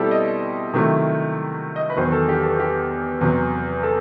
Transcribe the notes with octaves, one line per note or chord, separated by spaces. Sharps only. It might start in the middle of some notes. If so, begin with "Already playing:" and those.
Already playing: B2 G3 C4 E4 G4 A4
D#5
C3 D#3 F#3 A3 E4
D#5
B4
E2 D#3 F#3 C5
A4
G4
A4
G4
E2 C3 F#3
A4